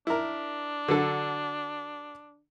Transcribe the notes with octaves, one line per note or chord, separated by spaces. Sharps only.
D4 E4 A#4
D3 F#3 A4